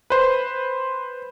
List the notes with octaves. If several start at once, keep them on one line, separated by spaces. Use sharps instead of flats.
B4 C5